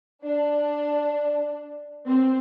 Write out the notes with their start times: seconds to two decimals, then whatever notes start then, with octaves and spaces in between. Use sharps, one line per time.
0.24 D4
2.07 C4